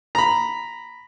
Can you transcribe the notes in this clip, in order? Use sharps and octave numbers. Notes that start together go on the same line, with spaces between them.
A#5 B5